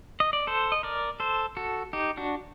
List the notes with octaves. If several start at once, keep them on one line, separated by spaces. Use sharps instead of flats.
D#5
D5
A4 C5
D#5
A#4 D5
A4 C5
F#4 A4
D#4 G4
D4 F#4